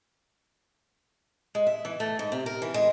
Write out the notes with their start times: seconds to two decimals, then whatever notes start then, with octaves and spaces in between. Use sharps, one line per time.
1.55 G#3
1.67 E5
1.85 E3
2.00 A3
2.19 G#2
2.32 C3
2.46 A#4
2.62 E3
2.74 G#3